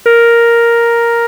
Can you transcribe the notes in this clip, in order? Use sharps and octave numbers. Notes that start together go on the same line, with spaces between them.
A#4